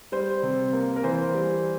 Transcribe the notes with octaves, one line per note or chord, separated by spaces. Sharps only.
G3 C5
C3
A#3
A#4
E3 C5
G3